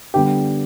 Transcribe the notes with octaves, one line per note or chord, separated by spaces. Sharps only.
D3 G3 B3 G4